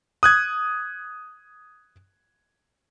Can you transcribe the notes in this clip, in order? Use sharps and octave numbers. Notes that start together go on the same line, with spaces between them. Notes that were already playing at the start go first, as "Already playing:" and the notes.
D#6 F#6 G#6